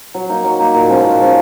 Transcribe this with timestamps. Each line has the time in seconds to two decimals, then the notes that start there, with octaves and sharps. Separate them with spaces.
0.14 F#3
0.29 A#3 D#4
0.44 F#3
0.59 A#3 D#4
0.75 A#2
0.89 F3 G#3 C#4
1.04 A#2
1.19 F3 G#3 C#4